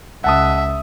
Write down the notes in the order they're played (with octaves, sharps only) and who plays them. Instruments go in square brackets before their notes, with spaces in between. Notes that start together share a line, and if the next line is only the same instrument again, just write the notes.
[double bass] C#2 [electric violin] E5 [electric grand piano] F#5 A5 D#6